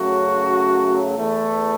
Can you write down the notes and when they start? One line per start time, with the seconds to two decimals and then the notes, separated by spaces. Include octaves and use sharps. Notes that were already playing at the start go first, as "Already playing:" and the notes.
Already playing: F#2 C#3 F#3 A3 F#4
1.16 E2 E3 A3